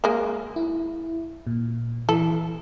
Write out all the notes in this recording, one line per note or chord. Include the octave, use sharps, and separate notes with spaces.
G#3 A#3
E4
A#2
E3 A4